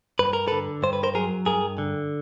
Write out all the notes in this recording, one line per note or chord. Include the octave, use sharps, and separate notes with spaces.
G2 B4
A#4
D3 A4 B4
G2 C5
B4
A#4 C5
F#3 G#4 A#4
G2 G#4 A#4
D3